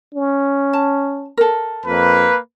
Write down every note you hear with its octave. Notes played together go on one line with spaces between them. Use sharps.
C#4
A5
A4 A#4
F2 A#3 B4